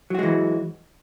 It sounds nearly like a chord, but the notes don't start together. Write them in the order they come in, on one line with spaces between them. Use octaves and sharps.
F#3 F#4 G#3 E3